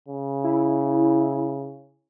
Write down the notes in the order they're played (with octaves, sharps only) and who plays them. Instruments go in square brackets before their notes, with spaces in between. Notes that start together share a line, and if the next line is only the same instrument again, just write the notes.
[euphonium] C#3
[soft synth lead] E4